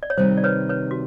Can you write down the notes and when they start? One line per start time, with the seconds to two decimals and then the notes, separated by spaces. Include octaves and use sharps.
0.03 D5
0.10 C#5
0.17 C3 D#3 G3 C5
0.37 D5
0.44 B4 C#5
0.69 B4 C#5
0.91 F#4